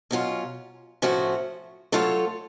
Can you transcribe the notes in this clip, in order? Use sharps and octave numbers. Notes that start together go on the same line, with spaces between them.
B2 F#3 C#4 F4
A2 F3 A3 C#4 F#4
F#3 A3 F4 A4 C#5